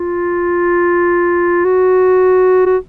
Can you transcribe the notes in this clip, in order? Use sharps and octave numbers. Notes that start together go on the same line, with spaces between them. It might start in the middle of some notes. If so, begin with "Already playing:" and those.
Already playing: F4
F#4
F#4